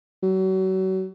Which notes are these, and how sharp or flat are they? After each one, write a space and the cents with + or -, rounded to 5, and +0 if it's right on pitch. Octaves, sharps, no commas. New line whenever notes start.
F#3 +35